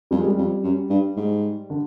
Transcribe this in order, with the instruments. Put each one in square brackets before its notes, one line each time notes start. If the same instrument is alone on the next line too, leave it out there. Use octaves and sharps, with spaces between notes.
[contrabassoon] F2 [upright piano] G3
[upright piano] G#3
G3
[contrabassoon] F2
F#2
G2
G#2
[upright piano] D3